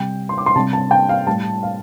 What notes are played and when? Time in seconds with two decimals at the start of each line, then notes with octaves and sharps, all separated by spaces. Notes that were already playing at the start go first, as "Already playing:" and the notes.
Already playing: C3 G3 G5
0.29 C6
0.38 D6
0.46 C6
0.55 C3 G3 A5
0.73 A5
0.91 G5
1.09 F5
1.27 A2 G3 A5
1.63 F5